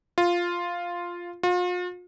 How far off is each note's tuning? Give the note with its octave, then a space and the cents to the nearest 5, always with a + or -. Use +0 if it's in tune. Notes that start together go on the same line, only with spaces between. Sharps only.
F4 +0
F4 +40